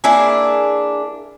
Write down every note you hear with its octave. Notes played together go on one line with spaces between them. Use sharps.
A#3 D4 E4 G#4